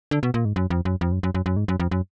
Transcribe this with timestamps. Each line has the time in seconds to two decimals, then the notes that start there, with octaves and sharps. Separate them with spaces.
0.11 D3
0.23 B2
0.34 A#2
0.45 G#2
0.56 F#2
0.70 F2
0.85 F#2
1.01 F2
1.12 F#2
1.23 F#2
1.35 F#2
1.46 F#2
1.57 G#2
1.68 F#2
1.80 F2
1.91 F#2